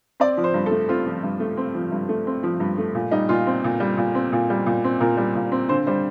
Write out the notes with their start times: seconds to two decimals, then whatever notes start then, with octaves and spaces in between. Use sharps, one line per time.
0.20 C4 D5
0.37 F3
0.44 C5
0.54 G2
0.66 A4
0.71 A3
0.89 C4 F4
1.06 F3
1.23 G2
1.40 A3
1.57 C4
1.74 F3
1.92 G2
2.09 A3
2.27 C4
2.43 F3
2.60 G2
2.78 A3
2.95 A#2
3.11 G3 D#4
3.29 A#2 F4
3.47 C4
3.64 A#2
3.80 G3
3.97 A#2
4.15 C4
4.32 A#2
4.50 G3
4.66 A#2
4.84 C4
5.00 A#2 A#4
5.17 G3
5.35 A#2
5.52 C4
5.69 D3 C5
5.87 G3 C5